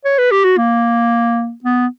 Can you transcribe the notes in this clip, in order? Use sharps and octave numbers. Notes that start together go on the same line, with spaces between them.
C#5
B4
G4
F#4
A#3
B3